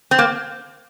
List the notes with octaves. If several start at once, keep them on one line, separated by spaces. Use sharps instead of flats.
C4
A#3